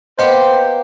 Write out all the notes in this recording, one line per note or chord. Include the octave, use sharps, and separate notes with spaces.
A#3 B3 G4 C5 D#5